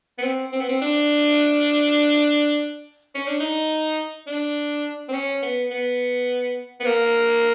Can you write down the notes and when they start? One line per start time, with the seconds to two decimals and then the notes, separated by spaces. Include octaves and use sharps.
0.18 B3
0.23 C4
0.52 C4
0.60 B3
0.69 C4
0.81 D4
3.15 C#4
3.28 D4
3.40 D#4
4.27 D4
5.08 C4
5.13 C#4
5.42 B3
5.70 B3
6.80 B3
6.86 A#3